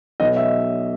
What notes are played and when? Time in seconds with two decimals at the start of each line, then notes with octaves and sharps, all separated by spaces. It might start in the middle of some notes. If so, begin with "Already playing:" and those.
0.20 B1 B2 F#3 D#5
0.37 E5